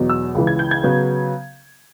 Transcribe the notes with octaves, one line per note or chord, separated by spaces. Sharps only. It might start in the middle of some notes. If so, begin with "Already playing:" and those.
Already playing: E2 B2 F#3
E6
C#2 C#3 E3
G#6
G6
G#6
C#3 F#3 B3